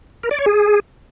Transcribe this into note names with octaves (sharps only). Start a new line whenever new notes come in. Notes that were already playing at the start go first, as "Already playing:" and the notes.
A#4
D5
C#5
G#4